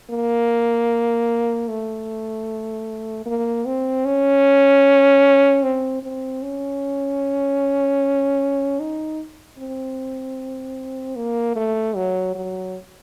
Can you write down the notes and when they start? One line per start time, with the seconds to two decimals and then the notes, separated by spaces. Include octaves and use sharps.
0.10 A#3
1.68 A3
3.26 A#3
3.65 C4
4.05 C#4
5.63 C4
6.03 C4
6.42 C#4
8.80 D#4
9.58 C4
11.16 A#3
11.56 A3
11.96 F#3
12.35 F#3